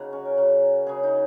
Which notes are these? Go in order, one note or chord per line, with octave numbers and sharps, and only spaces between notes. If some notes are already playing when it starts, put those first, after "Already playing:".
Already playing: C#3 F#3 A#3 D#4 F#4
C#4
A#4
C#3 F#3
C#3 F#3 G#4
D#4